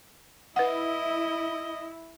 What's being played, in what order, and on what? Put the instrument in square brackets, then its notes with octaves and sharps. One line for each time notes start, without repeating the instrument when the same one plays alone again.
[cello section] E4 [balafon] B4 F#5 [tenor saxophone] D#5